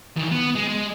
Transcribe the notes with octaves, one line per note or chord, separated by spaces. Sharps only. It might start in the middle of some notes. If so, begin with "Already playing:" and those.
D#3 E3
B3
G#3
G#3